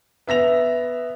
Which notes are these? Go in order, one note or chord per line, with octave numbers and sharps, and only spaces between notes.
B3 E5 A#6 F7